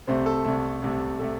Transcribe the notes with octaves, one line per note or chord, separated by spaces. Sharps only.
C2 C3 A3 C5
A4
C2 C3 A3
C2 C3 A3
C3 A3 A4